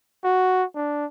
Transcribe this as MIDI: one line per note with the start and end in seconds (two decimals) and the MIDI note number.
0.24 0.64 66
0.75 1.06 62